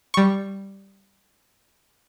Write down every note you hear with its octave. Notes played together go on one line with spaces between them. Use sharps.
G3 C#6